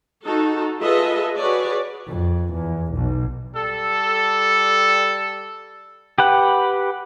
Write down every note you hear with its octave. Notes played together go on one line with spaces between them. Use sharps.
D#4 F#4 A4
F4 G#4 A4 B4 D#5 E5
F#4 G#4 B4 C#5 D5
F2
E2
B1
G3 A4
G4 B4 F#5